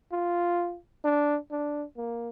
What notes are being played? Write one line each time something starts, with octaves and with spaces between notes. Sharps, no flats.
F4
D4
D4
A#3